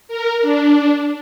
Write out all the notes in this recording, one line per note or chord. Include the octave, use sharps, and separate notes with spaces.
A#4
D4